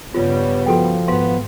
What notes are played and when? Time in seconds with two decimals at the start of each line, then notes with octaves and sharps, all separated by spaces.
0.14 G2 C#3 G3 B3 F4 C#5
0.66 F3 F#4 A4 G5
1.08 G#1 B3 F5 C6